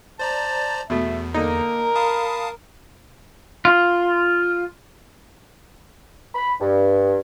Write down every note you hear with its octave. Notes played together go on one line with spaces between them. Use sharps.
C5 D5 A5 A#5
E2 B2 A3 E5
D3 A#3 D#4 A#4
F5 A5 B5 D#6
F4
B5
G2